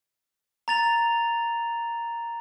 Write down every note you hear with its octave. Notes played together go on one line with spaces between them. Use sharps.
A#5 A6 F7